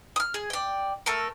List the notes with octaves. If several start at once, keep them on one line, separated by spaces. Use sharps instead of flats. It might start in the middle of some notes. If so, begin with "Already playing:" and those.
D#6 F6
G#4
D5 G5
A3 A4 A#4